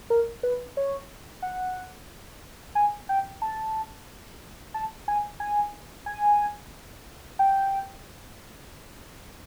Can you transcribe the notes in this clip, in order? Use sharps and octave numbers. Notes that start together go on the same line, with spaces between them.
A#4
B4
C#5
F#5
G#5
G5
A5
A5
G#5
G#5
G#5
G5